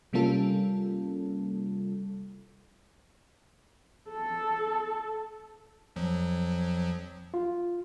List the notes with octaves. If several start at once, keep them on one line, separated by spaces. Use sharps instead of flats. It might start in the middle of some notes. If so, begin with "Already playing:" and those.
C3 G3 A#3 C#4 F4 A4
A4
F2 F3 F#3
F4